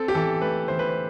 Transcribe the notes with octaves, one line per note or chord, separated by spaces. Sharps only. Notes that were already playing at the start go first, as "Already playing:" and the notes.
Already playing: C4 A4
G4
E3 A4
A3 B4
E3 C5
B4
C5